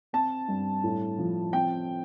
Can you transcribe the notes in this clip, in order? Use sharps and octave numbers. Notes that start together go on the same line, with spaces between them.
C4 A5
G2
A2
F3
C4 G5